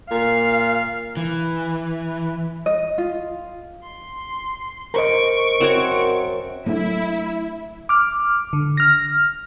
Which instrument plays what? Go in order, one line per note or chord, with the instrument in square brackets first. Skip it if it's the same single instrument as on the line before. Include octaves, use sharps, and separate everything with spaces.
[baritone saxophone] A#2 [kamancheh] F5
[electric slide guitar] E3
[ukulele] D#5
F4
[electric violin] C6
[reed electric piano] A#4 C5 D#5 [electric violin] C#6 D7
[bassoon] F#2 [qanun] C4 F#4 C#5
[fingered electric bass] F#3 A3 D4 [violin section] E4
[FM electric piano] D6 F6
D3
F6 A#6